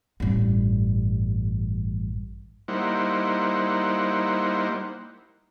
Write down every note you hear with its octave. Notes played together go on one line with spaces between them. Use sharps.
A1 G2
G3 A#3 D#4 E4 C5 F#5